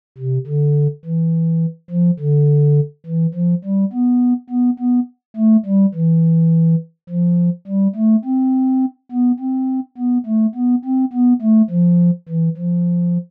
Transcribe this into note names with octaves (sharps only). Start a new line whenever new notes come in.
C3
D3
E3
F3
D3
E3
F3
G3
B3
B3
B3
A3
G3
E3
F3
G3
A3
C4
B3
C4
B3
A3
B3
C4
B3
A3
F3
E3
F3